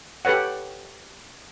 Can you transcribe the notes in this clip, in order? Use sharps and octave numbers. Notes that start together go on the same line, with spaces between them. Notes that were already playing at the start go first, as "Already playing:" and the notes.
G4 A4 B4 C#5 F#5